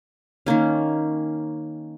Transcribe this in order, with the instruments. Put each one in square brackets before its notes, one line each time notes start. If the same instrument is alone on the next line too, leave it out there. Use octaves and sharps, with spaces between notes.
[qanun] D#3 A#3 C#4